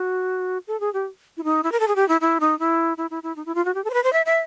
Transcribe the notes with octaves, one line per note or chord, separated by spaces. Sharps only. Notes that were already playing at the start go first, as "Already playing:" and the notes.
Already playing: F#4
A4
G#4
G4
E4
D#4
E4
A#4
A4
G#4
G4
E4
E4
D#4
E4
E4
E4
E4
D#4
E4
F4
F#4
G4
A4
C5
B4
C5
E5
E5